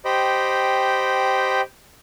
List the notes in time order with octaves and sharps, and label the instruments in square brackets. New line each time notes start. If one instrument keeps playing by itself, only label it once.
[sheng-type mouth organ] G4 C5 D#5 G5 B5